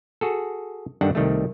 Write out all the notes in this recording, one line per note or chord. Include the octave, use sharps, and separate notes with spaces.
F#4 G#4 A4
G2 D#3 G3 D4 A4 F#5
C2 D#3 G3 A3